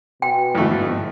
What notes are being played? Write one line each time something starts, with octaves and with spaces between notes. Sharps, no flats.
B2 G5
G1 F2 G#2 D3 E3 A3